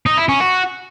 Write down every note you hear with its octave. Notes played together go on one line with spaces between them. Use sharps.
D#4
E4
C#4
F#4